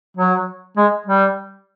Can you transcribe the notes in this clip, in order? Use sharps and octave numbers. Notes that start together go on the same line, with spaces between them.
F#3
G#3
G3